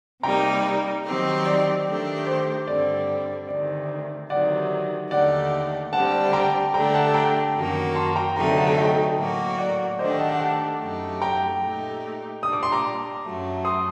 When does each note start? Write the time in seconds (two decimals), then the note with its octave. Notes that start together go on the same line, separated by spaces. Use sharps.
0.23 C3 G3 A#3 D#4 G5 A#5
1.05 D#3 F#3 C4 D#4 G4
1.46 D5
1.86 D#3 A3 D4 G4
2.27 C5
2.67 G2 D3 G3 C4 D5
3.49 D2 C3 D#3 D5
4.30 D2 C3 D#3 F#3 D5 F#5
5.11 D#2 D3 A3 D#4 G4 D5 F#5
5.93 D2 D3 G3 C4 G4 F#5 A5
6.33 G5 A#5
6.74 D3 A3 D4 G4 G5 A#5
6.94 F#5 A5
7.14 G5 A#5
7.55 F#2 D#3 F#3 A#3 F#4
7.95 A5 C6
8.16 G5 A#5
8.36 D2 C3 F#3 A3 D#4 G5 A#5
8.57 F#5 A5
8.77 D#5 G5
9.18 A2 F#3 A#3 F#4
9.58 D5 F#5
9.99 D#3 A3 D4 G4 C5 D#5
10.10 D#5 G5
10.19 F#5 A5
10.30 F#5 A5
10.40 F#5 A5
10.80 F#2 F#3 A3 D#4 G4
11.22 G5 A#5
11.62 A#2 A3 D#4 G4
12.43 A#2 G3 D4 D#6
12.53 D6
12.63 C6
12.72 A#5 D6
13.24 F#2 F#3 A3
13.65 C6 D#6